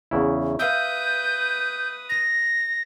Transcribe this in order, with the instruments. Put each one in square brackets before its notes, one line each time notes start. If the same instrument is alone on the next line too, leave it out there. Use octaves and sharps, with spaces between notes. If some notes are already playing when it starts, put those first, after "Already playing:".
[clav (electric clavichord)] E2 C#3 E4
[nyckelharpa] B4 D#6 [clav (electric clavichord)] E5 F5 [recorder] G6
[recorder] A#6